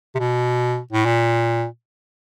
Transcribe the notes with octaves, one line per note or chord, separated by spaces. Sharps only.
C3
B2
A2
A#2